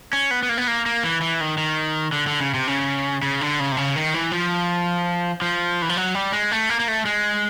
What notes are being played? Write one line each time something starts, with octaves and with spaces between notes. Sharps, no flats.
C#4
B3
B3
A#3
B3
A#3
A#3
E3
E3
D#3
D#3
D3
D3
C#3
C3
C#3
C#3
D3
C#3
C3
C#3
D#3
E3
F3
F3
E3
F3
F#3
G3
G#3
A3
A#3
A#3
A3
G#3